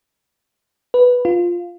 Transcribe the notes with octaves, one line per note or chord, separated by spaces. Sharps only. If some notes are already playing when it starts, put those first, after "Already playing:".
B4
F4